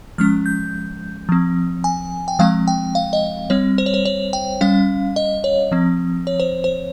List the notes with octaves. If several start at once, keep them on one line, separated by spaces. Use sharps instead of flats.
F3 G#3 C#4 F6
G6
F3 C4
G#5
G5
F3 G#3 C4 F5
G5
F5
D#5
G3 C4 C#5
C5
C#5
C5
C#5
G5
G3 C#4 F5
D#5
C#5
F3 C4
C#5
C5
C5